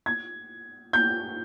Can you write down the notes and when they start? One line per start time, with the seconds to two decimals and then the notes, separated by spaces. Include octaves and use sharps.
0.06 G#6
0.93 G6